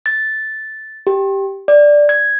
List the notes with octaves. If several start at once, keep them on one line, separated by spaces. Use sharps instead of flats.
A6
G4
D5
G#6